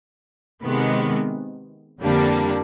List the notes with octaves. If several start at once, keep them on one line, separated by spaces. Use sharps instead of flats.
C3 D#3 G#3 B3
F2 D3 G3 A#3 D4